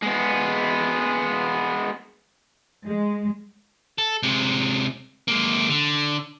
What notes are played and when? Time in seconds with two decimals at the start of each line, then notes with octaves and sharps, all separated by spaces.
0.03 G#3 B3
2.87 G#3
3.98 A4
4.23 C3 G#3
5.28 G#3 A#3
5.69 D3